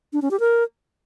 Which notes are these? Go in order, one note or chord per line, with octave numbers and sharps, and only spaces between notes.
D4
C#4
G4
A#4